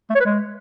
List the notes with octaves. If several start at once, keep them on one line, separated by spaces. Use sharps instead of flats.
A3
C#5
B4
G#3